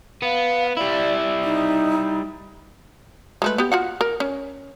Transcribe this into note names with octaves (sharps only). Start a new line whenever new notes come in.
B3 F5
G3 E4 D5
D#4
G#3 A3 B4
B3 G4
F4 F#4 F#5
A#4
C#4